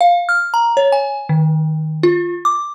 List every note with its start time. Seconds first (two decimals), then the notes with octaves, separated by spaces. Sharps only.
0.01 F5
0.29 F6
0.54 A#5
0.77 C#5
0.92 G#5
1.29 D#3
2.03 F4
2.45 D6